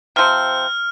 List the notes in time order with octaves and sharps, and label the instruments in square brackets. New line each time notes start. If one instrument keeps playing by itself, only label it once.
[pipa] C3 F3 C4 [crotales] F6